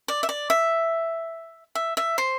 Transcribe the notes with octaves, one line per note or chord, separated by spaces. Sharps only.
D5
E5
D5
E5
E5
E5
C5